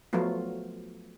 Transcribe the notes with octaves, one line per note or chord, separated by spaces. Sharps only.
F3 F#3 A3 B3 F4